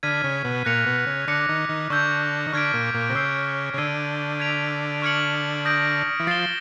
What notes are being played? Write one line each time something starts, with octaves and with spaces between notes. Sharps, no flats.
D3 F6 G#6 B6 D#7
C#3
B2
A#2 F#6 A#6 C#7 F7
B2
C#3
D3 D6 F#6 A#6 C#7
D#3
D#3
D3 C#6 E6 G6
D#3
D3 C#6 F6 G#6 B6 D7
A#2
A#2
C3
C#3 E6 G6 C7
C#3
D3 E6 G#6 C7 D#7
G#6 B6 D7 F7
C#6 F6 G#6 C#7 F#7
D#6 G6 A#6 D7
E3
F3 A6 C7 E7 G7